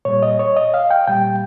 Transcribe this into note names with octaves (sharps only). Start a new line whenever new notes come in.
A#2 G3 C#5
D#5
C#5
D#5
F5
G5
A#2 G3 G5